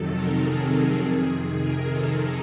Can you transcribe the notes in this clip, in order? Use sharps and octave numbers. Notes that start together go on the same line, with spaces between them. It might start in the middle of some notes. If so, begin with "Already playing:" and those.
Already playing: F2 C3 D#3 F#3 A4
A#4
G#4
F2 C3 D#3 G#4
A#4
A4